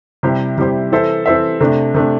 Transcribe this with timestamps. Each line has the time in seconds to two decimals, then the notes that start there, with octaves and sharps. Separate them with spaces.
0.23 C3 G3 E4 G4 C5
0.58 C3 G3 E4 G4 C5
0.92 E3 C4 A4 C5 E5
1.26 E3 C4 A4 C5 E5
1.61 C3 A3 D4
1.94 C3 A3 D4